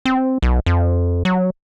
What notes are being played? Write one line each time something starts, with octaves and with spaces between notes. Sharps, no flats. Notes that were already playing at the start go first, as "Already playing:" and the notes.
C4
B1
F2
F#3